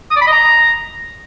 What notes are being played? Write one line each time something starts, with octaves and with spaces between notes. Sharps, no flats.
D#6
D5
B5
D#5
A#5